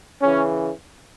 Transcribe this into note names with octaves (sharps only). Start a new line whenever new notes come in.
C#3 E3 C#4